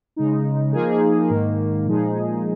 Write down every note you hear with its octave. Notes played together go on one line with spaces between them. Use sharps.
C#3 G#3 D#4
F3 A#3 D#4 G#4
G#2 D#3 A#3
A#2 F3 G#3 D#4 G#4